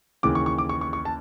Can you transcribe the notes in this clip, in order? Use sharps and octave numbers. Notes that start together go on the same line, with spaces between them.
D#2 C#3 E3 D6
C#6
C#6
D6
C#6
C#6
C#6
A5